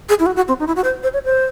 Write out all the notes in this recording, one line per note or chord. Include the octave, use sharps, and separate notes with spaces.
G#4
E4
F#4
F#4
C4
D#4
E4
F#4
C5
C5
C#5
C5